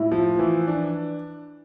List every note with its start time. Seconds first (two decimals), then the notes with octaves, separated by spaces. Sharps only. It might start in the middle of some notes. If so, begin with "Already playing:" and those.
Already playing: A2 E4
0.12 F3
0.39 E3
0.68 D4